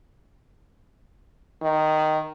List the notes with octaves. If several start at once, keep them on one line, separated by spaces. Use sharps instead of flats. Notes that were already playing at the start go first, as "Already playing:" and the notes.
D#3